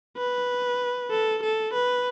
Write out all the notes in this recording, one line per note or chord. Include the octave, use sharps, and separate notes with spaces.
B4
A4
A4
B4